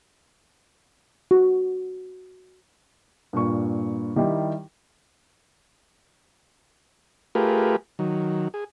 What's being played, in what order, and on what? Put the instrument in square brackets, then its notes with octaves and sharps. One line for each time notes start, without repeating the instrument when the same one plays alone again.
[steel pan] F#4
[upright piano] G2 A#2 C#6
D#3 G3 D#4 E4 G4
[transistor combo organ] A3 F4 G4 G#4 A#4 B4
D#3 F#3
G#4